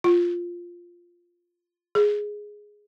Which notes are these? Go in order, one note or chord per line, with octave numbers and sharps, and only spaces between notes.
F4
G#4